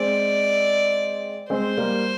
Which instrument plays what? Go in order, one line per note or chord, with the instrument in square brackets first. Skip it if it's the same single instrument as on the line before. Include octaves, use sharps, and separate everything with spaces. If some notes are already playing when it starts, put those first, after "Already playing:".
Already playing: [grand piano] G#3 C4 [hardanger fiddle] D5
[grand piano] G#3 C4 [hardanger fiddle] C5
[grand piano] G3 A#3